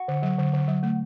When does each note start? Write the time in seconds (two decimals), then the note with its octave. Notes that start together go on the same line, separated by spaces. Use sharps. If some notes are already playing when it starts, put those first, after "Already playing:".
Already playing: F#4
0.08 D3
0.23 F#3
0.38 D3
0.54 D3
0.68 F#3
0.83 A3